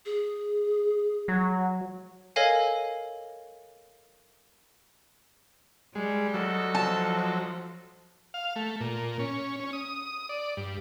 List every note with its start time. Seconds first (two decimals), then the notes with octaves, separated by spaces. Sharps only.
0.06 G#4
1.28 F#3
2.36 A4 A#4 C#5 D#5 F5 G#5
5.95 G3 G#3
6.34 D2 F#3 D#4 A4
6.75 F3 A5
8.34 F5
8.56 A3
8.81 A#2
9.19 C#4
9.60 C#4
9.73 D#6
10.29 D5
10.57 G2